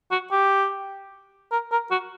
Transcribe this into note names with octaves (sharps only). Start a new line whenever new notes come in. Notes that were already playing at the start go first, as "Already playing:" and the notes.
F#4
G4
A#4
A#4
F#4